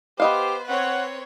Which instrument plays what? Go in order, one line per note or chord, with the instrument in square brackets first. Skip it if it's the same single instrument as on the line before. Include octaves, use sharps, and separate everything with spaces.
[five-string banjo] B3 D#5 F5 [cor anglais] G4 [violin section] C5
[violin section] C4 B4 C#5 [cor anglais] F#5